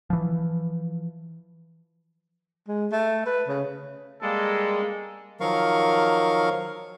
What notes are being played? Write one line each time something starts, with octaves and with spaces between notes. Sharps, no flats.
E3 F3
G#3
A3
B4
C#3
G3 G#3 A#3 A4
D#3 F3 F#3 A#4 F5 C#6